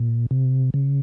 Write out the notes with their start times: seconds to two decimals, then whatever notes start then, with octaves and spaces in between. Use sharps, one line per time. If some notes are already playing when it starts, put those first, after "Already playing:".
Already playing: A#2
0.31 C3
0.74 C#3